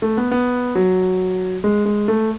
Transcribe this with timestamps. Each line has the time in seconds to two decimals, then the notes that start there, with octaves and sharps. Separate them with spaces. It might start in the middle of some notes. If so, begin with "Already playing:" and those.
0.02 A3
0.17 B3
0.31 B3
0.75 F#3
1.64 G#3
1.86 G#3
2.08 A3